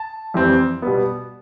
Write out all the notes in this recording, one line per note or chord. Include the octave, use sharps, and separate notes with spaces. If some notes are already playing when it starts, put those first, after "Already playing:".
Already playing: A5
F2 E3 G3 C4
B2 G3 B3